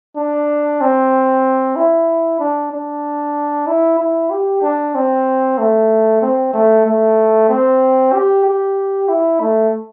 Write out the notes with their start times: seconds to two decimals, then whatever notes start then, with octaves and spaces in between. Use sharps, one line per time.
0.17 D4
0.81 C4
1.76 E4
2.40 D4
2.72 D4
3.67 E4
3.99 E4
4.30 G4
4.63 D4
4.95 C4
5.58 A3
6.22 C4
6.54 A3
6.86 A3
7.49 C4
8.13 G4
8.45 G4
9.09 E4
9.41 A3